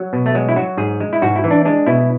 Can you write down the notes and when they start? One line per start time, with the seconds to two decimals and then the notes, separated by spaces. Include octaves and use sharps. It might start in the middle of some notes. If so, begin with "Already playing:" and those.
Already playing: F#3
0.13 B2
0.26 A3
0.35 F#3 G#3
0.49 E4
0.56 F#3 F#4
0.77 G#2 G#4
1.00 G#3
1.13 E4
1.22 G#2 F#4
1.36 E4
1.44 E3
1.51 D4
1.65 G#3 D4
1.86 B2 E4